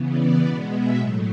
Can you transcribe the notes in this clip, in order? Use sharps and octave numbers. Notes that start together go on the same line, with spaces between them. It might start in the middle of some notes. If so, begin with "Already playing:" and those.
Already playing: C#3 E3 B3
D5
B2 G#3 B3 D5
E5
A2 F#3 A3 C#5